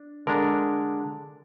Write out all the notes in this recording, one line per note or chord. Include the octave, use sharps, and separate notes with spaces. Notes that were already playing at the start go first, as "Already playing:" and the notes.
Already playing: D4
D3 G#3 D4 A#4